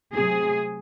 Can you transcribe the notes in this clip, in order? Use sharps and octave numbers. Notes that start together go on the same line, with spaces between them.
C3 F#3 A3 C4 G#4